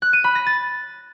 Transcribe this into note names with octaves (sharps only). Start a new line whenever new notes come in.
F#6
D#7
B5
A#6
A6